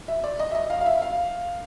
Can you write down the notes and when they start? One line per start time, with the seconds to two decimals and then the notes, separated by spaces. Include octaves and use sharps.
0.08 E5
0.24 D5
0.39 D#5
0.51 E5
0.55 D#5
0.70 F5
0.81 F5
0.86 E5
1.02 F5